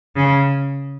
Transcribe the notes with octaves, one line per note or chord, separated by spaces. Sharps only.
C#3